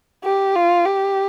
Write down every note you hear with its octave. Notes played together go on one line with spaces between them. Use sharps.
G4
F4
G4